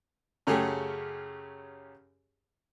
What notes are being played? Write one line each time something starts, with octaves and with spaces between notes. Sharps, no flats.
F#2 C#3 A3 C#4 G4 G#4